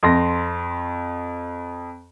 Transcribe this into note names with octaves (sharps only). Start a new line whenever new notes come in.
F2 C6 A#6